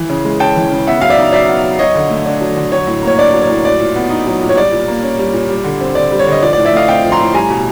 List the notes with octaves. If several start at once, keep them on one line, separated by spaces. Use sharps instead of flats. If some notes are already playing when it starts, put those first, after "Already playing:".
Already playing: E3
C#3
G#3
C#4 G5 A5
E3
C#3
B3 E5 F#5
F#3 F5
D5 E5
D#4
F#3 D5 E5
B3
F#3
F#3 C#5 D#5
D3
A3
D4
F#3
D3
F#3 C#5
A2
A#3 C#5
D4 D5
F#3
C#5
A2
F#3 D5
A#2
B3
D#4
F#3
A#2
C#5
G3 D5
A#2
A#3
C#4
G3
A#2
G3
D3
C4
D3 D5
G3
C#5
D3 D#5
F3 D5
D5
A2
D5 E5
A3 D#5 F5
C4 F5 G5
F3
A#5 C6
A2
G3 G#5 A#5
B2